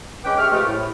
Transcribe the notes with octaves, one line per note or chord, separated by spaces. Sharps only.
G#3 C#4 B4 G5 D6
G4 G#4 E5 C#6 F6
F3 G#3 A3 G4 B4 D#5
A2